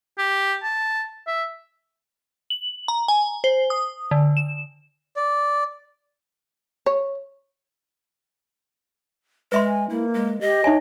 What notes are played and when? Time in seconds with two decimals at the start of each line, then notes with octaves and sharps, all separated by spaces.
0.18 G4
0.63 A5
1.27 E5
2.50 F#7
2.88 A#5
3.08 G#5
3.44 C5
3.70 D#6
4.11 D3
4.37 E7
5.17 D5
6.86 C#5
9.52 G#3 B4 E5 C6
9.65 G#5
9.89 A#3 E4
10.14 G#3
10.41 G4 D#5
10.64 D#4 C#5 E5 G#5